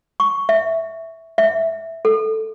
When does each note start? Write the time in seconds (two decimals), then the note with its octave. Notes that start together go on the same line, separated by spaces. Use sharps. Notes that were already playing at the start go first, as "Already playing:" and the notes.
0.20 C#6
0.49 E5
1.38 E5
2.05 A4